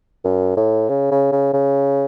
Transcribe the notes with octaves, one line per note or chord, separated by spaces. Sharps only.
F#2
A2
C#3
C#3
C#3
C#3